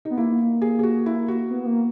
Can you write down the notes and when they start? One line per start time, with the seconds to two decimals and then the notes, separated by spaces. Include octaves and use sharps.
0.05 B3 D#4
0.17 A#3 E4
0.62 G#4
0.79 G#4
0.83 F#4
1.06 E4
1.28 F#4
1.50 B3
1.63 B3
1.66 A#3